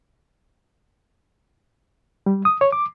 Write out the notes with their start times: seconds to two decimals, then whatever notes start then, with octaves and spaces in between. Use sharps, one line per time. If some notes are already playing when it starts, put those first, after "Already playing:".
2.26 G3
2.45 D#6
2.61 C#5
2.72 D6